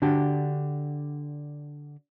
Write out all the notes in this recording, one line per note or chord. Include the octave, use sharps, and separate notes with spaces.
D3 D4 F#4 G4